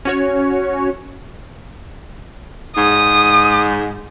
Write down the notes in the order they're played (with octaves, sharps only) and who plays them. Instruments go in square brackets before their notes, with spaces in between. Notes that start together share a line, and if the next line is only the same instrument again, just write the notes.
[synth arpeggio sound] C#4 F#4 C#5
[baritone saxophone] G#2 [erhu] D#6